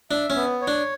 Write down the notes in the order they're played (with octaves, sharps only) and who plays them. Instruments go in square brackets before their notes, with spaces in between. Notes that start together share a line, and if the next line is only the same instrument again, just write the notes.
[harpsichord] D4 [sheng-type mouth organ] E5
[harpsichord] C#4
[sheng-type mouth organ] B3
C#5
[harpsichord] D4